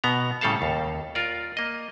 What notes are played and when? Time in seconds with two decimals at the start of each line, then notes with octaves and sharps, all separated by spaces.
0.04 B2 B3 A#5
0.41 A2 C#3 G3 A4 F5 A5
0.62 D#2
1.15 F4 A#4 D5
1.57 A#3 D#5